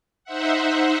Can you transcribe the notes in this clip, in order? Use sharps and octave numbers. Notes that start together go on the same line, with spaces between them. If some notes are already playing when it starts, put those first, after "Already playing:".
D#4 C5 E5 F#5